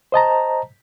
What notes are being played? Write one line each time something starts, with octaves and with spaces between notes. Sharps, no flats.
C5 D#5 A5 A#5